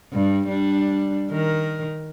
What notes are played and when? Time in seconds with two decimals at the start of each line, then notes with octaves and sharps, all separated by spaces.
0.13 G2 G3
0.48 G3 D4
1.30 D#3 A#4